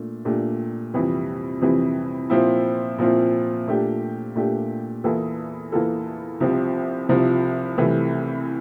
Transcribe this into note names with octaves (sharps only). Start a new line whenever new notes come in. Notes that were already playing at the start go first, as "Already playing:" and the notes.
Already playing: A#2 A3 D4
A#2 A3 D4 G4
F2 C3 E3 G3
F2 C3 E3 G3
A#2 F3 C4 E4
A#2 F3 C4 E4
A#2 A3 D4 G4
A#2 A3 D4 G4
E2 E3 A#3 F4 A4
E2 E3 A#3 F4 A4
C2 C3 F3 C4
C2 C3 F3 C4
C2 C3 E3 A3